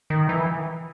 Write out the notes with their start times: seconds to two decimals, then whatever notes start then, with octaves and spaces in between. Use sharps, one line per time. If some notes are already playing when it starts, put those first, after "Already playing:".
0.10 D#3
0.29 E3